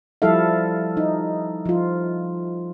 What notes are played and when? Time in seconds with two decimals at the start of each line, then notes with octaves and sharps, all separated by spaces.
0.22 F3 G3 E4 A4 E5 F5
0.97 D#4
1.66 F3 F4